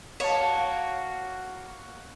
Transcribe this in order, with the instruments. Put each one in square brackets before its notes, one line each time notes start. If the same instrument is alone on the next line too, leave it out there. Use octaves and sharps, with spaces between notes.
[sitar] A#3 [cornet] F#4 [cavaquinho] C#5 [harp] D#5 A5